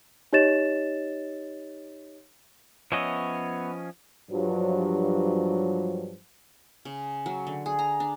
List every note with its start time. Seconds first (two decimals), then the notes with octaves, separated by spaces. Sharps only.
0.33 D#4 G4 C#5 D#5 A6 E7
2.92 F3 B3 C#4 C#5 D#5 E5
4.31 G2 F3 F#3
6.85 C#3
7.26 F#3
7.47 D3
7.66 G#4
7.79 A#5
8.00 D4